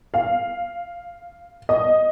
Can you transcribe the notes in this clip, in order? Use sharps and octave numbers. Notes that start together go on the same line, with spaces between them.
F5
D#5